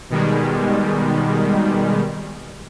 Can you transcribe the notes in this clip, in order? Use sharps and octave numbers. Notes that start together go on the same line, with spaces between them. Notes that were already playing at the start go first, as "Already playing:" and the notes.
B2 D#3 G3 G#3